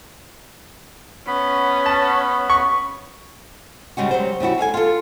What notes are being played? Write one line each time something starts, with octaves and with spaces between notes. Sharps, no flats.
B3 C#4 B5
A5
C#6
C#3 G3 G#3 F#4
F#3 G3 C5
C#3 G3 E4 F#4
G#4 A4 F5 G#5
F4 A4